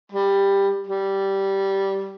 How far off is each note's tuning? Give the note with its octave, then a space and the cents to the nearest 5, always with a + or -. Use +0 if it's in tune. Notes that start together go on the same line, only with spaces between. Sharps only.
G3 +10
G3 -10